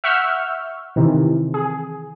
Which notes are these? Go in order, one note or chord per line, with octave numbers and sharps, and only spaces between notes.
E5 F#5 C#6 E6 F6 G6
C3 D#3 E3
G#4